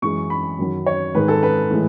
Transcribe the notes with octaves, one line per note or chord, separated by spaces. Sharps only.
F#2 E3 G#3 C#6
B5
F#2 D#3 F#3
C#5
G#2 D#3 G#3 B4
A4
B4
A2 E3 G#3